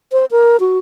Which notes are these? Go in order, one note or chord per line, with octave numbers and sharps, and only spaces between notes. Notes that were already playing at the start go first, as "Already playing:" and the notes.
C5
A#4
F#4